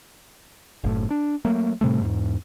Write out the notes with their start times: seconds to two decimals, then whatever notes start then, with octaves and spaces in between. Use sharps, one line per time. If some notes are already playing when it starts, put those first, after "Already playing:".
0.84 F#1 A2
1.11 D4
1.45 F#3 A3 A#3
1.81 A2 C3 G3 A3
2.01 E2 G#2